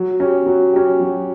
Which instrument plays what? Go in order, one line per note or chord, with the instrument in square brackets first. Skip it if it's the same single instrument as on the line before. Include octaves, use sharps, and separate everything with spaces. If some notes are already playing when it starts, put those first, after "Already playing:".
Already playing: [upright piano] F#3
C#4 G4
F#3
C#4 G4
F#3